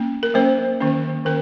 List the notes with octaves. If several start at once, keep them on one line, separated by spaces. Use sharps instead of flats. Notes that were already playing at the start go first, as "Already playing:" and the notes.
Already playing: A#3 C#4
A#4
F#3 A#3 C#4 C5
D#3 A#3 C#4
D#3 A#3 C#4 A#4